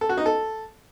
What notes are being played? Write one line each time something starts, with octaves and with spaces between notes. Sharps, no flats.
A4
F#4
D#4
A4